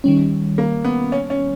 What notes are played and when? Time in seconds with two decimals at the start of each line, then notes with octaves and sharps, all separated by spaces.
0.04 D#3 G3 C#4
0.58 A#3
0.84 B3
1.12 C#4
1.30 C#4